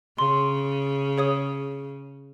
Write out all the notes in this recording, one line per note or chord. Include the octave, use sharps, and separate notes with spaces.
C#3 C6
G#4 C#5 D#6